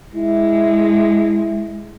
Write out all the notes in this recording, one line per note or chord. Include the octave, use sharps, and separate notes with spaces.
G#3 E4